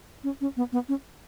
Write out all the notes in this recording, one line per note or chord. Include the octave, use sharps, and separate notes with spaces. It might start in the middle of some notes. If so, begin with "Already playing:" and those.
C#4
C#4
B3
B3
C#4